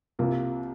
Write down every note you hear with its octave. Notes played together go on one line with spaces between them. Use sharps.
C2 C3 F3 A#3 F4